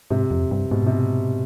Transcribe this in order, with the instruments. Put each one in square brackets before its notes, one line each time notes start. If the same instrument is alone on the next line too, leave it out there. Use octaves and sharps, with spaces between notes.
[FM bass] G#2 [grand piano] C3
[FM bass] F2
G2
[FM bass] G#2 [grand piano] B2
[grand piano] C3